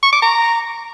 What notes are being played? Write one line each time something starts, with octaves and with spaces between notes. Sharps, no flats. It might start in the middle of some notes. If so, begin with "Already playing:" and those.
C#6
D6
A#5